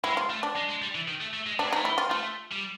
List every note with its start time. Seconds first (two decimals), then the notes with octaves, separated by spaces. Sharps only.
0.04 G#3 E4
0.17 F4
0.30 A3
0.43 D4
0.56 G#3
0.69 G#3
0.82 G3
0.95 E3
1.08 D#3
1.21 A3
1.33 A3
1.46 G#3
1.59 A3 D4
1.67 G#3
1.73 A3 D#4
1.85 E4
1.98 F4
2.11 A3 F4
2.52 G3